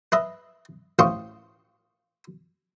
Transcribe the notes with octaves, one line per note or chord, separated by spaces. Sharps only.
B4 D#5 E5
A1 C5 F5 G5 C#6 D#6